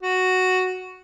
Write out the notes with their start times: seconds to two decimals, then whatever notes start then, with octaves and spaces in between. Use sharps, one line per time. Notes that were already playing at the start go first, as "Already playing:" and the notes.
0.03 F#4